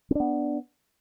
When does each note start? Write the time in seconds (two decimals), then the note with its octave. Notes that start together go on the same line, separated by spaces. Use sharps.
0.11 C4
0.15 D4
0.20 B3